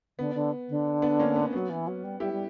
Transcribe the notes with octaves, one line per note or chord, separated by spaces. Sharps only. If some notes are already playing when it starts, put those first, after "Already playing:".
D3 B3
D3
D3
B3 D4
A#3 C#4
B3
F#3 B3
E3
F#3
G3
G3 E4 G4
G3